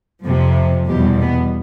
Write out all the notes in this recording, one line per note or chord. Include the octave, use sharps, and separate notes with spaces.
F2 C3 F3
E2 B2 G3 G4
B3